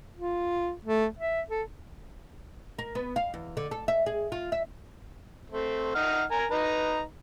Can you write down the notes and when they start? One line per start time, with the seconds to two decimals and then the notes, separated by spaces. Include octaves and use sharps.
0.17 F4
0.85 A3
1.19 E5
1.50 A4
2.79 A#4
2.95 B3
3.16 F5
3.34 E2
3.57 D3
3.71 A4
3.88 E5
4.06 G#4
4.32 F4
4.52 E5
5.50 A3 C4
5.95 D#4 F#5 F6
6.31 A#4 G#5 A#5
6.51 D#4 B4 A#5